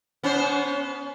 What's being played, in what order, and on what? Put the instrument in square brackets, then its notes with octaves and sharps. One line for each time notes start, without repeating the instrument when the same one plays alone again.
[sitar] B3 C#4 C5